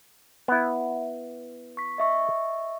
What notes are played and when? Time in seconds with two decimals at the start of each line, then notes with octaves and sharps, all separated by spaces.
0.48 B3 E4
1.77 C#6 B6
1.98 D#5 E5 C#6